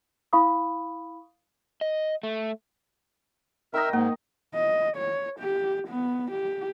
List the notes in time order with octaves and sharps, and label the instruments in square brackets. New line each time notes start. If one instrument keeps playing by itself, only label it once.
[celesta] E4 F5 B5 C#6 D#6
[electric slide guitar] D#5
A3
[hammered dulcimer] D#3 D#4 D#5 [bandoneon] A#4 E5
[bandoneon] G#2 [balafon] A#3
[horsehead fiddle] D#5
C#5
G4
B3
G4